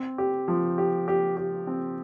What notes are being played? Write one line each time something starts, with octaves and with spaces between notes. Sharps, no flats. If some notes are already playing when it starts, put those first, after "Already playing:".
Already playing: C4
G4
F3
G4
G4
G4
C4